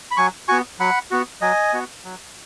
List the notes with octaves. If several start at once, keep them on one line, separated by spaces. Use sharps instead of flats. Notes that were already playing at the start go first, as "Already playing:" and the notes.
B5
F#3 G#5 C#6
B3 F#4 G#5 C#6
F#3 F#5 B5
B3 F#4
F#3 D#5 G#5
B3 F#4
F#3